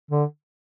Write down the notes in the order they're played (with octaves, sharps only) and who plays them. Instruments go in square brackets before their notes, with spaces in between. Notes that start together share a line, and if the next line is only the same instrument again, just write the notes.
[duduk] D3